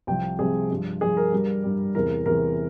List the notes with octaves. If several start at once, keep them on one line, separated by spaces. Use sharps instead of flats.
C2 C3 F3 G5
C2 C3 F3 G#4
G2 F3
G2 F3 G#4
A#4
G2 G3
G2 G3
E2 C3 E3 A#4
E2 C3 E3 A#4